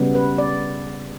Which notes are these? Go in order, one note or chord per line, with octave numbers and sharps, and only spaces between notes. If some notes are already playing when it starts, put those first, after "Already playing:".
Already playing: C#3 G3 B3
B4
D5